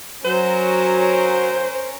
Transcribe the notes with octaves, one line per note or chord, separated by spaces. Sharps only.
F#3 C#4 A#4 C5